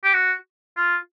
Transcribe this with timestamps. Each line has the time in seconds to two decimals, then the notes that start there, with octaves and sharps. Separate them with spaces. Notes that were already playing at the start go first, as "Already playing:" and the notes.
0.04 G4
0.13 F#4
0.77 F4